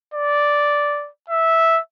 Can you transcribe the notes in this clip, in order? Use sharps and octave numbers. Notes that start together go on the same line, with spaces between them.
D5
E5